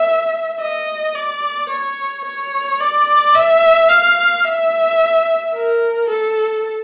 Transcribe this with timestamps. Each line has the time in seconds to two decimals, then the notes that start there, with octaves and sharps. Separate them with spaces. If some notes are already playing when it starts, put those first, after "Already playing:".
Already playing: E5
0.60 D#5
1.15 D5
1.70 C#5
2.25 C#5
2.80 D5
3.35 E5
3.89 F5
4.45 E5
5.54 A#4
6.09 A4